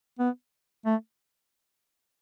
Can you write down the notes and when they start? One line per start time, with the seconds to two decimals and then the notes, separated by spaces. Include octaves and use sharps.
0.19 B3
0.85 A3